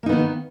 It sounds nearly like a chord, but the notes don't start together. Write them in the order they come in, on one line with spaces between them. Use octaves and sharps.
A#3 D#4 B3 D#3